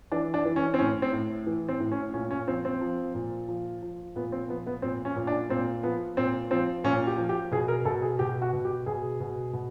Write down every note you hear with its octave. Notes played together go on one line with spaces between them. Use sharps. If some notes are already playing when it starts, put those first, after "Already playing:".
E3 D4
D4
E3
C#4
C4
A2 C#4
C4
A2
E3
C4
A2
C#4
A#2 C#4
C#4
F3 C4
C4
F3
A#2
F3
F3
A#2 B3
C4
F3 B3
B3
A#2 C4
C#4
A#2
D4
A#2 C4
F3 B3
A#2 C4
F3 C4
A#2 C#4
G4
F3
G4
B2 G#4
A#4
B2 A4
G#4
B2 G4
F#4
B2
G4
B2 G#4
B2
B2